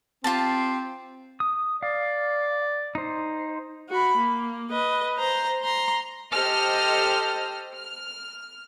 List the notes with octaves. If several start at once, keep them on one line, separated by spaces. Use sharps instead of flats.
C4 F4 G4 A5
D#6
D5 F5
D#4 C5
F#4 B5
A#3
B4 D#5
C5 A#5
A#5 C6
G4 A4 C5 D#5 F6
F6